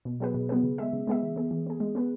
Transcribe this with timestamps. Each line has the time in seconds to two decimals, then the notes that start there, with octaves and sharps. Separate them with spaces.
0.05 B2
0.20 F#3 B3 G#4 B4
0.34 B2
0.49 F#3 B3 G#4 B4
0.64 C#3
0.78 G#3 B3 G#4 E5
0.93 C#3
1.07 G#3 B3 G#4 E5
1.22 E3
1.36 B3 G#4
1.51 E3
1.66 B3 G#4
1.80 G#3
1.95 B3 G#4 B4